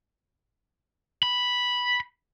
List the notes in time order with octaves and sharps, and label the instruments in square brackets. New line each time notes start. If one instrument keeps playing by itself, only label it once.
[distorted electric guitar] B5